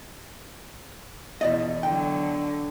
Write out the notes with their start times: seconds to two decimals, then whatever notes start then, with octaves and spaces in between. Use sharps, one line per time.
1.41 E2 B2 E4 D5 D#5
1.83 D3 F#3 G5